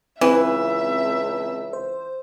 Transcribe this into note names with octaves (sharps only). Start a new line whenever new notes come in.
C#2 E3 C4 E5
C5